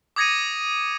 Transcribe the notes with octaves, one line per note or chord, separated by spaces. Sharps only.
D6 D#6 G#6 A#6 C#7 D#7